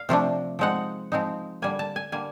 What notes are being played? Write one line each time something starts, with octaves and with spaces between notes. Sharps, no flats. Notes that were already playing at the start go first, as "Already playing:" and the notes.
Already playing: F5
C3 F3 A3 D4 F4
F3 G#3 C4 D#4 F#5
F3 G#3 C4 D#4
D3 G3 A#3 G#5
A5
G#5
D3 G3 A#3 G#5